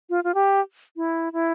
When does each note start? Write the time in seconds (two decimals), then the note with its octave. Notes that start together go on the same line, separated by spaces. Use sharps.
0.10 F4
0.24 F4
0.35 G4
0.96 E4
1.33 E4